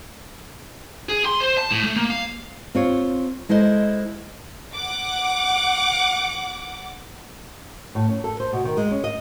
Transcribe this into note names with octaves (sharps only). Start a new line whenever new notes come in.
G#4
C6
C5
A5
A2
A3
A#3
F5
C4 F4 C#5
G#3 E4 A4 C5 D#5
F#5 D6
A2
C#4
A4
C5
B2
D#3
G#3
C#4
D#5